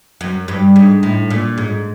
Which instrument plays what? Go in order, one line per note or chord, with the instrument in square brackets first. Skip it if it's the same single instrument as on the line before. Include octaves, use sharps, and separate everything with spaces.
[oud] F#2
G2
G#2
A2
A#2
G#2